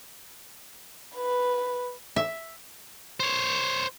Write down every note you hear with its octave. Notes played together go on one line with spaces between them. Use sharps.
B4
E5
C5 C#5